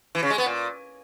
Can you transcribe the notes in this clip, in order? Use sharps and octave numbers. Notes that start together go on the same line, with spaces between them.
E3
C#3
G#3
B3
A#2